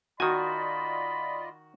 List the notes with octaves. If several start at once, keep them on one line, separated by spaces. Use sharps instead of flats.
D#3 F4 F#4 D5 D#5 G#5 B5